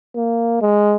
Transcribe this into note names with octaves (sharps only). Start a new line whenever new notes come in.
A#3
G#3